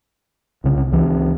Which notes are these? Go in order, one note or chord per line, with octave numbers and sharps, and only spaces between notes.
C2 C#3
C#2 E3